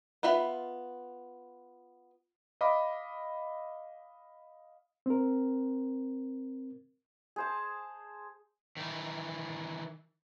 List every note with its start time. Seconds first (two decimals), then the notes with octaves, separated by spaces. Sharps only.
0.23 B3 F4 E5 B5
2.61 D#5 F5 B5 D6
5.06 C4 A#4
7.36 G#4 C5 A5
8.77 D#3 E3